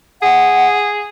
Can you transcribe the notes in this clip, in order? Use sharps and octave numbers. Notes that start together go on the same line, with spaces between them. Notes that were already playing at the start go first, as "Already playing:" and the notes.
G#4 F#5